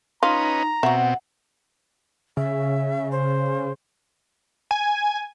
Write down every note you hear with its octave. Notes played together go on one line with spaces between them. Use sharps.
C#4 D#4 F4 B4 D#5 A#5
B2 C4 F#4 E5 F#5
C#3 E5
C5
G#5